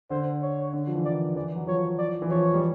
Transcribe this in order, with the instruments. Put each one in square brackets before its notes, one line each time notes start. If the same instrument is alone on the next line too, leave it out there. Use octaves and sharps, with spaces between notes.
[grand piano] D3 [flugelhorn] C5
[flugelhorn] C#5
[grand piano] D3
F3
E3
[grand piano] D#3 [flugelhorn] D5
[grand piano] E3 [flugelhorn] D5
[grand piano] F#3
[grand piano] F3 [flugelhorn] C#5
[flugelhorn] D5
[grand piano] E3
[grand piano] F3 [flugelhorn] C#5
[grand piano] G3